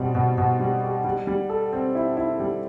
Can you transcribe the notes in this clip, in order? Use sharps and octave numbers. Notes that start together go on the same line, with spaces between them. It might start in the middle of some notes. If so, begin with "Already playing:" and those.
Already playing: B2 G3 C4
B2
B2
G3
G4
G3
G3
A4
C4
E4
E4
G3